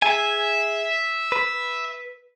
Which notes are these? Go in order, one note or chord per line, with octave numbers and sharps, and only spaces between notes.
G#4 E5 G#5
B4